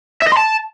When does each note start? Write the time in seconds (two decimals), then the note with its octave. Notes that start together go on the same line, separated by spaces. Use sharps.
0.22 E5
0.27 D#5
0.32 C6
0.37 A5